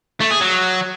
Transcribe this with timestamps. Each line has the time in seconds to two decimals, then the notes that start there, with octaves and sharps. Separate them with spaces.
0.21 A3
0.31 G#4
0.41 F#3